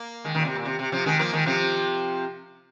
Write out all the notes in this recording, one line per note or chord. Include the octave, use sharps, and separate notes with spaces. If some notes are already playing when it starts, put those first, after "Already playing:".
Already playing: A#3
D#3 G#3
A#2 D#3
C3
A#2
C3
C3
C3 F3
D#3 G#3
F3 A#3
D#3 G#3
C3 F3